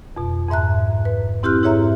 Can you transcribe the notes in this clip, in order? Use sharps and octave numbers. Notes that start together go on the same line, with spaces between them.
F2 B2
F2 G#2 E5 A#5 F#6
B4
C4 E4 G4 C6 F6 F#6
G#2 E4 G#4 C#5 E5 A#5